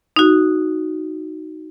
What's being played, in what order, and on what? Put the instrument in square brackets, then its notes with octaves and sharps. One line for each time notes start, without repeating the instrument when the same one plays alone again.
[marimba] D#4 F#4